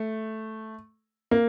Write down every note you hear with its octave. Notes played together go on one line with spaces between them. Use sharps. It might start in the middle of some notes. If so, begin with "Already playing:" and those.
Already playing: A3
A#3